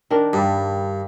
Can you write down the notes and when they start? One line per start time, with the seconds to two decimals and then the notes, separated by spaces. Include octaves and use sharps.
0.10 D#3 D4 A#4
0.33 G2 G3